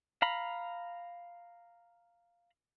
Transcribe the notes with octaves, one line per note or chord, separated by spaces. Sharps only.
F5 A#5 B5